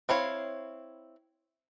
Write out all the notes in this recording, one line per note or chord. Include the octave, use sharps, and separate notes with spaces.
C4 E4 C#5 F5